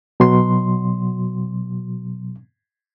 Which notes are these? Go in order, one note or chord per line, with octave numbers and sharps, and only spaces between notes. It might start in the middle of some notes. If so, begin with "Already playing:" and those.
B2 F#3 C6